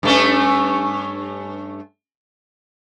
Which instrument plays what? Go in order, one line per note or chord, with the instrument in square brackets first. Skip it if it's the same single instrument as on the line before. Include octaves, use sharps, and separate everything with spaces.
[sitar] G2 A3 C#4